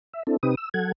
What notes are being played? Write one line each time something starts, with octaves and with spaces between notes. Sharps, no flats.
E5
C4 D4 E4 A4
C3 C4 D#4 G4 B4 D#6
E6
F#3 A4 F#5 G#6